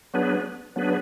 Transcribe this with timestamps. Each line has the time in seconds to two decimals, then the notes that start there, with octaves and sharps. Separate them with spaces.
0.14 F#3 B3 D4 G#4 B4
0.76 F#3 B3 D4 G#4 B4